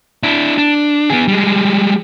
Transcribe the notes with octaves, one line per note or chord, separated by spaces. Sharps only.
D4 E4
D4
B3 G#4
G3 G#3